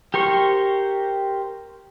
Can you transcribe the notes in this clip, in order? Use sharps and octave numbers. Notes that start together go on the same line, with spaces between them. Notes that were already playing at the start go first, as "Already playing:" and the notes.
G4 A#4 C5 C#6